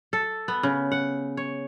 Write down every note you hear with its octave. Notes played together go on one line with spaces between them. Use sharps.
A4
B3
C#3
F#5
C#5